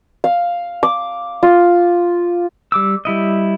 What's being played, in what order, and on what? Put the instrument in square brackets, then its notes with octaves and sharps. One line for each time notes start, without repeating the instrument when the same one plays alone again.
[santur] F5
D6
F4
[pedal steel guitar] G3 D6 E6
G3 E4 D#5